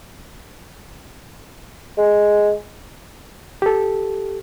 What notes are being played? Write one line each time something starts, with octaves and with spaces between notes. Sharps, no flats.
G#3
G4 A4